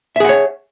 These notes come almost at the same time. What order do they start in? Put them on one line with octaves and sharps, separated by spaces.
E5 G#4 F#5 C#5